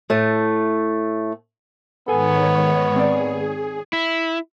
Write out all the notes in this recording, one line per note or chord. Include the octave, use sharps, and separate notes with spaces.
A2 A3
G#2 D#3 B3 A4 C#5 G#5
C4 G#4 D5
E4